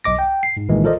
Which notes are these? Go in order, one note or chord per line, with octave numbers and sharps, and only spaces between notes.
B1 D#5 D6 A#6
G5
C7
G#2
C2 A#2 D#3 E3 G#3
F4 A4 A#4 C5 D5 D#5